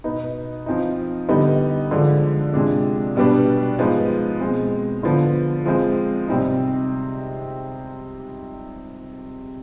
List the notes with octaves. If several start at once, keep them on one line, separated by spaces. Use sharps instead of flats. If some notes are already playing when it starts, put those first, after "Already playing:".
B2 B3 D#4
F3 C4 D#4
D3 G3 B3 D#4
D3 F3 G#3 D4
C3 F3 G#3 D4
B2 G3 B3 D4
F3 G#3 B3 D#4
B2 G#3 C4
D3 F3 B3
F3 G#3 C4
C3 G3 C4 D#4